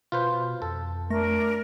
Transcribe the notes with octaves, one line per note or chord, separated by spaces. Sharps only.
B2 F4 B4 C5
F2 A4
A3 D4 A#4 A#6